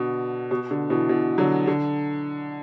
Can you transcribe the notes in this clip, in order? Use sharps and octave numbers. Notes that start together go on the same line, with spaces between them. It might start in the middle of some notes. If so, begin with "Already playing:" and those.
Already playing: B2 D3
B2
D3
B2 E3
B2 E3
D3 F#3
D3